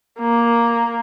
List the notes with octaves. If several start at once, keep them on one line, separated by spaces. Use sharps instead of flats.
A#3